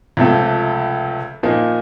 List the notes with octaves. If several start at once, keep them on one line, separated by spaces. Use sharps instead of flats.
C#2 C3 F3 A3
A#2 F3 A#3 D#4